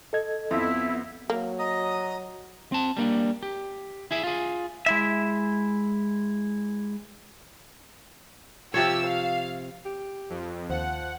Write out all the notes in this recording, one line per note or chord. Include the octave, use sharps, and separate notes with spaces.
A4 D#5 G#6
F2 B3 E4 E5
F#3 A#3
D#5 A#5 D#6
C4 A5
G3 A#3 D4
G4
E4 G#4 E5
F4 G#4
G#3 E4 E5
C3 F3 G4 C#5 E6
F5
G4
F2
D#2 F3 C5 F#5